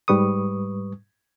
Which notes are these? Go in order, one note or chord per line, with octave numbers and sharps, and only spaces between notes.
G#2 G3 B4 C#6 D#6